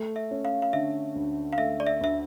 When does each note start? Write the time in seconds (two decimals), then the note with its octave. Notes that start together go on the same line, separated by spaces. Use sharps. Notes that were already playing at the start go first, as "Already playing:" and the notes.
Already playing: A3
0.16 E5
0.31 C#4
0.45 F5
0.62 F5
0.73 D3 E5
1.16 D2
1.52 F5
1.58 A3 E5
1.80 D5
1.87 E5
2.01 D2 E5